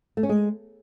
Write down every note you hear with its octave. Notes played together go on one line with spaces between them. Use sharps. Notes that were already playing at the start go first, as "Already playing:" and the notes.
A3
C#4
G#3